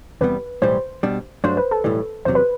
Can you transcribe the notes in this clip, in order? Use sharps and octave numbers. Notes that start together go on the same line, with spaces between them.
E2 C3 G3 B3 B4
B1 A2 E3 G3 C5
B2 G3 D4
G2 F#3 A3 D4 F#4 C5
B4
A4
B1 A2 E3 G3
E2 C3 F#3 C5
B4